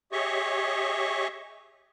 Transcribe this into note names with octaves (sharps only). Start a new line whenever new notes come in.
G4 G#4 C#5 D#5 E5 C#6